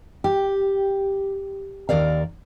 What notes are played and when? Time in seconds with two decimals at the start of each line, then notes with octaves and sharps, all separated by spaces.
0.24 G4
1.89 D#2 A#4 D5 F5